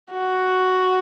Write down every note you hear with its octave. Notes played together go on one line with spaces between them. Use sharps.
F#4